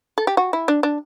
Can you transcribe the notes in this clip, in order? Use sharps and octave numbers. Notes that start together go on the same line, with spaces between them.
A4
G4
F#4
E4
D4
D4